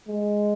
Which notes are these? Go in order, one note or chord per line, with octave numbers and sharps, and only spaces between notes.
G#3